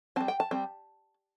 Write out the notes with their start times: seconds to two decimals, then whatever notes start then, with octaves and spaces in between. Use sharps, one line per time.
0.16 G3 C4 A5
0.28 G5
0.40 A5
0.51 G3 C4